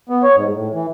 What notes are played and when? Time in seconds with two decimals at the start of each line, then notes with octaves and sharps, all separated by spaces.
0.09 B3
0.23 C#5
0.36 G#2
0.53 A2
0.74 E3